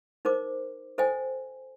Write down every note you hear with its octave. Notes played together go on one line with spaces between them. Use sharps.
D#4 A#4 C5 D6
A4 C5 D#5 G5 G#5